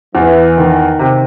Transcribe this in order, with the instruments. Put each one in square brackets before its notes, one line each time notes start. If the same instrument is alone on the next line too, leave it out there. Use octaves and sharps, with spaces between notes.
[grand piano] E2 [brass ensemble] E3
[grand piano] D#3
C3